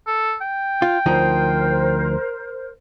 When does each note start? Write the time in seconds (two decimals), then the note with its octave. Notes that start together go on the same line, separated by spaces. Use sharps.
0.07 A4
0.42 G5
0.82 F4
1.06 D2 F3 D#4 A#4 C5